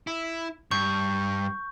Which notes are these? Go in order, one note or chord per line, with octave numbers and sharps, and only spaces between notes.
E4
G2 C#6 G6